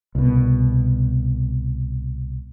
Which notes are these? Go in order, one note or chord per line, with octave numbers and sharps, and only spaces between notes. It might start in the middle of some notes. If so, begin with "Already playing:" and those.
C2 B2